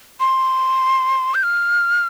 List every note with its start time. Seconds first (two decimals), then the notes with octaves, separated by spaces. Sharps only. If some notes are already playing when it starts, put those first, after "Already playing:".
0.20 C6
1.34 G6
1.43 F6